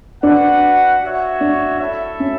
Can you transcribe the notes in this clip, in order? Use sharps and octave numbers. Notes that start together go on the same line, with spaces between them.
D4 F#4 B4 F#5
F#4 C#5 E5
D4
E4 A4 E5
C#4